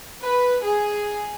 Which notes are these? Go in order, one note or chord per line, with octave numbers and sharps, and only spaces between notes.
B4
G#4